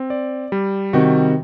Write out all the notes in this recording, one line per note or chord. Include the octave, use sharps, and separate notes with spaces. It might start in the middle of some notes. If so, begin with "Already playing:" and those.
Already playing: C4
D5
G3
C3 D#3 F#4